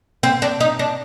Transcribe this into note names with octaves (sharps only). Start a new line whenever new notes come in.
C4
D4
D#4
D4